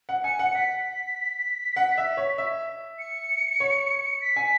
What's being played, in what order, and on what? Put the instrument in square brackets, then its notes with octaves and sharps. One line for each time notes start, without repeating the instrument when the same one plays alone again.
[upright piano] F#5
[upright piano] G#5 [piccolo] C#7
[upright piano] F#5
[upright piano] F#5 [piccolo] B6
[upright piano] F#5
E5
C#5
E5
[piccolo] C#7
[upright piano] C#5
[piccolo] B6
[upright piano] G#5